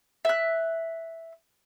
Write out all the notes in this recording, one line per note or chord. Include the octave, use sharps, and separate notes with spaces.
E5 F#6